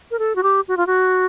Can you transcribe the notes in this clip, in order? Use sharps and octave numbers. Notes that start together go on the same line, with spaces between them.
A#4
A4
F#4
G4
F#4
F4
F#4